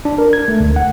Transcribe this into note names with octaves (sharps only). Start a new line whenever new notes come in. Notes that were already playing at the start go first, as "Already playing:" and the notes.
D4
A#4
G#6
A3
D2
F#5